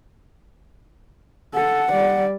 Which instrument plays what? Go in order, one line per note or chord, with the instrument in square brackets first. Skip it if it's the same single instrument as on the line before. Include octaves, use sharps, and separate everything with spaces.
[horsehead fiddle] A4 [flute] F#5
[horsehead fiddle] G3 D5